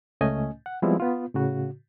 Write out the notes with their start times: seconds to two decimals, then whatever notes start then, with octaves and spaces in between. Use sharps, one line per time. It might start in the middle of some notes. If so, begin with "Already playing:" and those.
0.21 C#2 A3 C#4 D#5 G#5
0.66 F#5
0.82 F3 G3 G#3 B3 C4 E4
1.00 B3 F4
1.34 A2 C#3 F#4